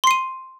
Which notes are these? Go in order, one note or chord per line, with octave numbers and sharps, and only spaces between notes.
C6 C7 D#7